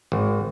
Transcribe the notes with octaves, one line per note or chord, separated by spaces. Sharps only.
G#1